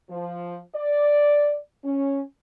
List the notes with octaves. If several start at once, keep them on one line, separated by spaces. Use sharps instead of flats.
F3
D5
C#4